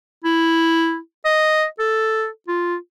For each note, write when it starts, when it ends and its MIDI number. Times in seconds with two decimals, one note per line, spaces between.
0.24 0.98 64
1.25 1.65 75
1.79 2.27 69
2.48 2.76 65